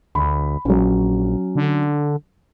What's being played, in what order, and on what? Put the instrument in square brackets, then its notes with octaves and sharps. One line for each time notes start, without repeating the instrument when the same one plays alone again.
[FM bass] D2 [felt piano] B5
[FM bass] A#1 [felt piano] F#3 C#4
[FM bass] D3